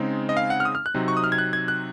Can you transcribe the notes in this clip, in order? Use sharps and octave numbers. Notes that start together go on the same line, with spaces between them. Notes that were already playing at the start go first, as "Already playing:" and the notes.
Already playing: C#3 G#3 C4 D#4
D#5
F5
F#5
F6
D#6
F6
F#6
C3 F#3 C4 D#4
C#6
D#6
F6
G#6
F#6
G#6
F#6